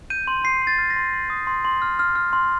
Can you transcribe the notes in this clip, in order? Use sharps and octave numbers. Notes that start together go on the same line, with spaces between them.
G6 D#7
C6
C6 C7
C6
A6
F6
A#6
C6
C6
D#6
C6
C6
F6
F6
F6
C6